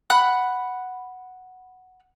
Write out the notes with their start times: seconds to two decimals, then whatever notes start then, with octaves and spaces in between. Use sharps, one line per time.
0.10 F#5 B5 F#6